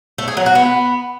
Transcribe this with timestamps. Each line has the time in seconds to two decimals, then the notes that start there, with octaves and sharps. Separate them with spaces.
0.18 A3
0.28 G#4
0.37 F#3
0.46 F#4
0.55 B3